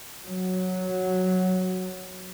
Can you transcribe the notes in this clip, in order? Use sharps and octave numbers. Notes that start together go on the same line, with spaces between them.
F#3